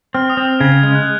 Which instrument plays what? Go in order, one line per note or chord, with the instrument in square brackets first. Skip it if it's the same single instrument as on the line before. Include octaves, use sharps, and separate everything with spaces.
[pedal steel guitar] C4 [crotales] F6
[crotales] D#6
[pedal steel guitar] C4
[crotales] F6
[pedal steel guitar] C#3 [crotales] G#6
[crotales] G#6
[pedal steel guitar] G#3 [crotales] G#6
[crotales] F#6